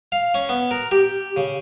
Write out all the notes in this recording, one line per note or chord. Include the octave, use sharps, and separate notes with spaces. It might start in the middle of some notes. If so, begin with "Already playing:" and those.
F5
C#4
B3
A#4
G4
C#3